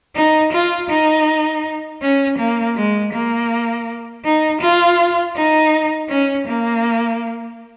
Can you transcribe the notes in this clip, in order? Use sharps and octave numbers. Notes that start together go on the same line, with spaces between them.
D#4
F4
D#4
C#4
A#3
G#3
A#3
D#4
F4
D#4
C#4
A#3